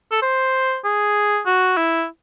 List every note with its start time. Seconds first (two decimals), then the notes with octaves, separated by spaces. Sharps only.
0.12 A4
0.22 C5
0.85 G#4
1.46 F#4
1.77 E4